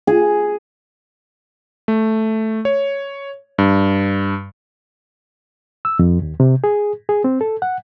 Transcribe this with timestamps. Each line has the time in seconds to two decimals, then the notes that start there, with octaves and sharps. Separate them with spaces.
0.07 G#4
1.88 A3
2.65 C#5
3.58 G2
5.85 E6
5.99 F2
6.22 D#2
6.40 C3
6.64 G#4
7.09 G#4
7.24 C4
7.41 A4
7.62 F#5